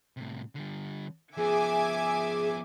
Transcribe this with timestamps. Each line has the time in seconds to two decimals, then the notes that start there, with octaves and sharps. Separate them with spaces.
0.17 A2 C3
0.55 D3 G3
1.37 F3 B3 G#4 E5 G#5 D6